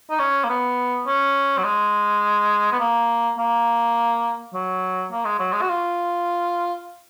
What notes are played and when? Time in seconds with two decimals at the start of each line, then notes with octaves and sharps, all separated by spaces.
0.10 D#4
0.19 C#4
0.44 A#3
0.49 B3
1.07 C#4
1.58 F#3
1.64 G#3
2.72 B3
2.80 A#3
3.38 A#3
4.54 F#3
5.11 A#3
5.25 G#3
5.39 F#3
5.52 G#3
5.62 F#4
5.69 F4